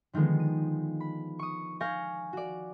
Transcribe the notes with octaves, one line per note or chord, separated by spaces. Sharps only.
D3 D#3 F3 G#3 B3
D#7
B5
C#6 D#6
F5 G#5 C#6 G6 A#6
F#4 D5